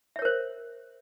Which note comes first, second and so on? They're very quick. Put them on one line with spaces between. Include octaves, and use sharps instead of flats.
E5 C#5 A#4 C5